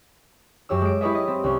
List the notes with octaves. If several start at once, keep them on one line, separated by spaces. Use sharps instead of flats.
F#2 G4 C#5 E6
G#3 D7
E4 G4 B4 C#5 D#5 E5
D#5
C4
C2 C#4